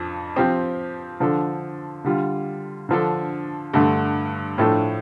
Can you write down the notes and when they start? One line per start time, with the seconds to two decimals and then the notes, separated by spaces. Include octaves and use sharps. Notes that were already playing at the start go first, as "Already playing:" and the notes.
Already playing: F2 F3 D4
0.36 F3 C4 G4
1.20 D3 F3 D4 A4
2.04 D3 G3 F4
2.89 D3 F3 D4 A4
3.74 G2 D3 A3
4.58 A2 F3 A3 D4 A4